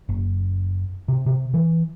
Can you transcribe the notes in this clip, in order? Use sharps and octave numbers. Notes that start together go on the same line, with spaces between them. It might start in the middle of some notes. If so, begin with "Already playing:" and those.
F#1
C3
C3
E3